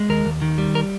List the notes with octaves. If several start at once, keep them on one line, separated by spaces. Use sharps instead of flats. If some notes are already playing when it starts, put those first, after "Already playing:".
Already playing: G#3
D#2 A#4
D#2
D#3
G3
A#4